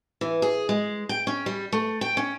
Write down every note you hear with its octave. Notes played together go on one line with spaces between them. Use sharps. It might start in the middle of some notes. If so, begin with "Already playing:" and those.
E3
G#4
G#3
G5
C#4
G3
A3
G5
C#4